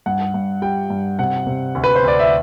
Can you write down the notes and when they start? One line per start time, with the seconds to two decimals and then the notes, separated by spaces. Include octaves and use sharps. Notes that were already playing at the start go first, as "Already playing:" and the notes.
0.06 G2 F#5
0.34 G2
0.62 G3 G5
0.90 G2
1.19 C3 F#5
1.47 C3
1.75 D2
1.84 B4
1.96 C5
2.04 D2 D5
2.19 E5